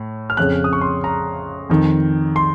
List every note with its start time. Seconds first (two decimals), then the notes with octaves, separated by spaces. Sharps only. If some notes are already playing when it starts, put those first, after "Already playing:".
Already playing: A2
0.30 F6
0.37 F2 C#3 F#6
0.64 D#6
0.73 C#6
0.81 C6
1.04 A#5
1.70 F2 D#3
2.36 C6